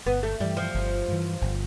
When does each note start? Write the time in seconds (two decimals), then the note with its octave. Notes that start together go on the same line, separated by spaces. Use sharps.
0.06 G1 B3
0.23 A3
0.40 G2 E3 G3
0.57 F3
0.74 G1
1.08 G2 E3
1.41 G1